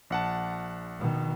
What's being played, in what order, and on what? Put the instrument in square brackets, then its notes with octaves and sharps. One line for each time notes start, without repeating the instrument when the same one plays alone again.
[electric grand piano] A#1 F#5 A5
[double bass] B2 D#3